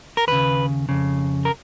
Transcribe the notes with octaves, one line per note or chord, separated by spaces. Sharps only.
A#4
D#2 C#3 B4
F2 C#3
A#4